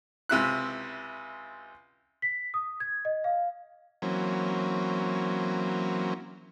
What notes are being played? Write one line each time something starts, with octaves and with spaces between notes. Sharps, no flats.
C#2 C3 E4 F#6
B6
D#6
G#6
D#5
F5
E3 F#3 A#3 C4 C#4